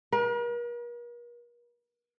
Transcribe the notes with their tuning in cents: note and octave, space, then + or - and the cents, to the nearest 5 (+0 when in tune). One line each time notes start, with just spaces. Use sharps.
A#4 +45